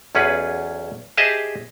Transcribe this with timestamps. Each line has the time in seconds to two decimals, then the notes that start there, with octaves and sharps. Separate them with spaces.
0.15 B1 E2 C#4 F4 G#4 B4
1.17 G4 G#4 C5 D#5 E5 A5